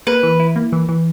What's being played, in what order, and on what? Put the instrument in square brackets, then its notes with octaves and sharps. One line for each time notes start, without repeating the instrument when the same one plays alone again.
[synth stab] A#3 [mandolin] B4
[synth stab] E3
E4
A#3
E3
E3